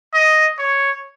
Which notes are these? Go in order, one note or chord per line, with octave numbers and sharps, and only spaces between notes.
D#5
C#5